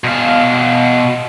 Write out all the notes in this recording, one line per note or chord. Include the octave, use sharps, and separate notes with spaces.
B2 F5